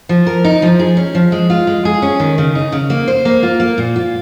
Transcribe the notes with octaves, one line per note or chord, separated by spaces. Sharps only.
F3
A#4
D#4
F3
G#4
C#4
F3
G#3
F4
G#3
G#4
C#4
D#3
C#3
D#4
C#3
A#3
C5
A#3
F4
A#3
A#2
F4